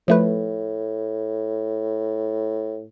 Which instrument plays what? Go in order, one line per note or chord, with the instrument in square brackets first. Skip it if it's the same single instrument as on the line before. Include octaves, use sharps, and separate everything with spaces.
[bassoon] A2 [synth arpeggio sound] F3 A3 B4